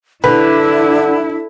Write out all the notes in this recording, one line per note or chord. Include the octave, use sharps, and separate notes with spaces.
D3 D4 E4 B4